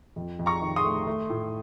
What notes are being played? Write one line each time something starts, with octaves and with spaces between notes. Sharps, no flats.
F2
F2
A#5 C#6
D#3
C6 D#6
A3
A3
A2